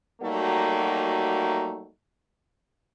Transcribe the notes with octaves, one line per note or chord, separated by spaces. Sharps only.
F#3 G3 A3 A#3 D#4 F#4